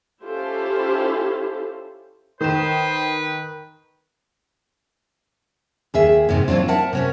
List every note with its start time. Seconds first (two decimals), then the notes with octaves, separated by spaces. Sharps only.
0.24 C#4 E4 F4 G4 A4 C5
2.41 D#3 B4 C5 E7
5.94 D#2 G#4 E5
6.29 E2 G#2 C3
6.48 E3 F#3 C4 D4 F4
6.68 A#4 E5 F#5 A5
6.93 C3 C#4 F#4